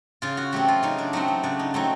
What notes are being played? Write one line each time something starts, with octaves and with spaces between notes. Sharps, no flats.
C#3 F4
F#4
F#3 A3 C4 G4
F4
C#3 D#4
D4
F#3 A3 C4 D#4
D#4
C#3 D4
D#4
F#3 A3 C4 D#4